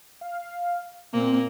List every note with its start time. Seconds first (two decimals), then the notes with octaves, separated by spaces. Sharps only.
0.21 F5
1.13 A#2 A#3 C4